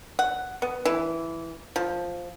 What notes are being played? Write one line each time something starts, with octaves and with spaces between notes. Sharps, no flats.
F#5
B3
E3
F3